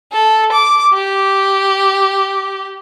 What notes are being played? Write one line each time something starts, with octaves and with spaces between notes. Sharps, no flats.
A4
D6
G4